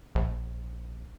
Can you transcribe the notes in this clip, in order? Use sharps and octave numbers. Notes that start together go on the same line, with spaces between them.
A#1